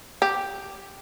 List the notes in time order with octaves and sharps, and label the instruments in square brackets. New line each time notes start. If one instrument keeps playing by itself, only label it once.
[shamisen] G4